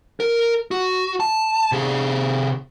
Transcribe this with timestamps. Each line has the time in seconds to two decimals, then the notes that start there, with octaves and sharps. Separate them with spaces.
0.20 A#4
0.71 F#4
1.20 A5
1.72 C3 G#4